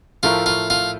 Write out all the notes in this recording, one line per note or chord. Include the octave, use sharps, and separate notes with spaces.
A2 F3 A3 E4 F4 A#4
F4
F4